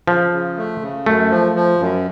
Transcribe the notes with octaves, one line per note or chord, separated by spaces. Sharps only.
C#3 F3
C#3
A3
C#3
F#2 A3
F3
F3
F#2